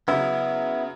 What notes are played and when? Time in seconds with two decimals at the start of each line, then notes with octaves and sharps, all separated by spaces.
0.08 C#3 F#3 B3 E4